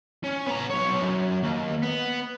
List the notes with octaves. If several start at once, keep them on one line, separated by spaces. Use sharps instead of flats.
C#4
B3 A#5
B1 C#5
F#2
D#2
B3